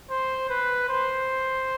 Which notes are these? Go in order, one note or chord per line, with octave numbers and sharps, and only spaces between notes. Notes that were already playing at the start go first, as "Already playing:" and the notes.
C5
B4
C5